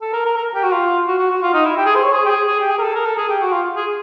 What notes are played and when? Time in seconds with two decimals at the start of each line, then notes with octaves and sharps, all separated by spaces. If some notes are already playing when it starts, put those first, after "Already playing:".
0.02 A4
0.13 A#4
0.26 A#4
0.37 A#4
0.54 G4
0.63 F#4
0.72 F4
1.07 F#4
1.19 F#4
1.30 F#4
1.43 F4
1.54 D#4
1.65 E4
1.77 G4
1.86 G#4
1.95 C5
2.04 C#5
2.13 G#4
2.25 G4
2.30 G#4
2.47 G#4
2.60 G4
2.70 G#4
2.79 A#4
2.82 A4
2.95 A#4
3.05 A4
3.17 G#4
3.29 G4
3.41 F#4
3.53 F4
3.76 G#4